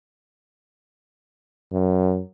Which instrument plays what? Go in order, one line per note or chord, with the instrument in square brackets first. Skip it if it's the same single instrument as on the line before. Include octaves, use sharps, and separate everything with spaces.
[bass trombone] F#2